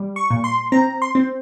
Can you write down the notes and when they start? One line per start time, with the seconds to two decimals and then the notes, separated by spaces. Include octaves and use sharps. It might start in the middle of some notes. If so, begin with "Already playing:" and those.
Already playing: G3
0.16 C#6
0.31 A#2
0.44 C6
0.72 C4 A#5
1.02 C6
1.15 C4